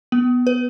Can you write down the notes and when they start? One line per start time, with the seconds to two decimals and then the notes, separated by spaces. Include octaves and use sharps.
0.12 B3
0.47 B4